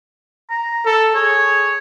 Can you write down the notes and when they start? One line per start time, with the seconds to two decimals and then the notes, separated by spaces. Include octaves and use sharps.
0.50 A#5
0.85 A4
1.15 G#4 C#5